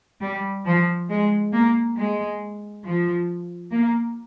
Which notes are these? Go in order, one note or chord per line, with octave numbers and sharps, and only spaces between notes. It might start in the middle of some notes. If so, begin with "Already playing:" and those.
G3
F3
G#3
A#3
G#3
F3
A#3